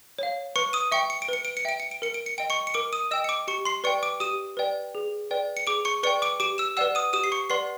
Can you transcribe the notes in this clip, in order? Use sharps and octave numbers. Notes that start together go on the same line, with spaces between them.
C#5 F5
B4 C#6 C#7
D#6 D#7
E5 G5 C#6 C#7
C#7
D7
B4 C#7
D7
C#7
E5 G5 D7
C#7
D7
A#4 C#7
D7
C#7
D#5 G5 D7
C#6 C#7
C#7
A#4 D6 D7
D#6 D#7
D#5 G5 E6 E7
C#7
D6 D7
G4 C#6 C#7
C6 C7
B4 D5 G5 C#6 C#7
D6 D7
G4 D#6 D#7
B4 D5 G5
G#4
B4 D5 G5
C#7
G#4 D6 D7
C#6 C#7
B4 D5 G5 C#6 C#7
D6 D7
G4 D6 D7
E6 E7
B4 D5 F#5 E6 E7
D#6 D#7
G4 D#6 D#7
C7
C#6 C#7
B4 D5 F#5 C6 C7